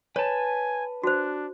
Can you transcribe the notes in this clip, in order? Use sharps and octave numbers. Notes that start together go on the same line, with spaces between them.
B4 C#5 G#5 A5
D4 F#4 C5